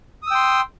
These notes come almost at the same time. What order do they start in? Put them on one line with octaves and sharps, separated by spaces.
D#6 E6 G5 C6